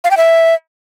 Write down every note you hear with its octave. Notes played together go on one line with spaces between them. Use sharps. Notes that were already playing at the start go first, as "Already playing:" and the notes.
F5
G5
E5